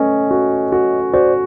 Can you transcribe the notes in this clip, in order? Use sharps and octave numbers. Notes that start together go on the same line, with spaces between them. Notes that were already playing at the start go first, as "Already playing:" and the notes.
Already playing: A3 C#4 B4 C#5 D#5
F#4
F#4
F#4 C5 D5